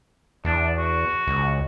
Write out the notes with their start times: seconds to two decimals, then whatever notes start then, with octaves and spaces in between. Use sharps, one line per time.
0.45 E2 D4
0.78 F#4
1.27 C#2